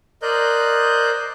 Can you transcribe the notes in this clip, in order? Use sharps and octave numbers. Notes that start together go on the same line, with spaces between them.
A#4 C5 D5 D#5 F#6 G6